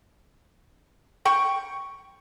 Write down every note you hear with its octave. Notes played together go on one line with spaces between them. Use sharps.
G5 C#6